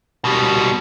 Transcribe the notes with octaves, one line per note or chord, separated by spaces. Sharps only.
B2 G3